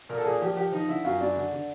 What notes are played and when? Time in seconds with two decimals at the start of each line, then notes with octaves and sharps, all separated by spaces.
0.09 A#2 A#4
0.18 A4
0.25 A#2 G#4
0.42 F3 G4
0.57 F3 G4
0.72 F3 D#4
0.88 D3 E4
1.04 F#2 F4
1.20 F#2 D4
1.36 D3
1.52 D3